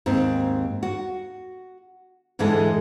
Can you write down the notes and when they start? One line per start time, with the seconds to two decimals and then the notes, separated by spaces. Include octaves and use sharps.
0.06 D#2 G#2 C4
0.83 F#4
2.39 D2 G#2 E3 G#3 G#4 A4